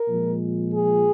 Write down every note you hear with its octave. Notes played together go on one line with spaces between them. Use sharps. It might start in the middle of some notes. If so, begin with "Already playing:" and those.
Already playing: A#4
A#2 F3 G#3
G#4